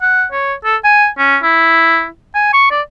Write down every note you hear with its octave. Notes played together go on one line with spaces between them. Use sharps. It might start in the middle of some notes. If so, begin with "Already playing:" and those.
F#5
C#5
A4
G#5
C#4
E4
G#5
C#6
D5